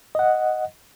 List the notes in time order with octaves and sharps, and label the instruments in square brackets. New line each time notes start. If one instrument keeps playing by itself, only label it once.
[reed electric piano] D#5 F#5